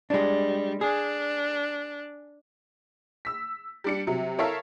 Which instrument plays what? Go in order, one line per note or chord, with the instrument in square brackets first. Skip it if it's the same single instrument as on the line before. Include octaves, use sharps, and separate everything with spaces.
[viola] G3 [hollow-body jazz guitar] G#3 D4
[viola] D4 [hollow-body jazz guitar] G#4
[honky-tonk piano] E6 B6
G3 D4 C#7
C3 F#3
E4 A4 A#4 C#5 E5 F5